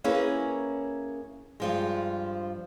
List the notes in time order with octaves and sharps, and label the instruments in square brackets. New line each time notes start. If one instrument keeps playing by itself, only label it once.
[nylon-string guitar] A#3 C#4 E4 G#4 A#4 B4
G2 F3 G#3